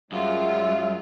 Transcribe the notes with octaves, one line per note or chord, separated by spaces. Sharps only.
F#2 G3 G#3 F4 E5